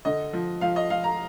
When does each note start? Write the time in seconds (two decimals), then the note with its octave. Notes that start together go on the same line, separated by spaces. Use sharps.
0.05 D3 D#5
0.33 F3
0.61 F3 F5
0.76 D#5
0.90 F3 F5
1.04 A#5